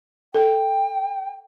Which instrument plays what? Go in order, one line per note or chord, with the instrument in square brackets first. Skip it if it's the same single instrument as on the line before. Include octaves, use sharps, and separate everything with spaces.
[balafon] A4 [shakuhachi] G5